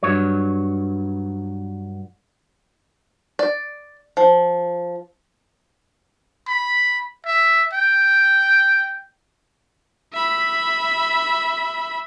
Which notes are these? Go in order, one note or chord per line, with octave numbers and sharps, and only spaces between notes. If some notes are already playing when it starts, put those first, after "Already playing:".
G2 F#3 C#5
D5
F3
B5
E5
G5
E5 B5